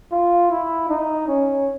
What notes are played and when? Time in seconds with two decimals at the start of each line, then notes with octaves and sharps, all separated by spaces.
0.12 F4
0.51 E4
0.89 D#4
1.28 C#4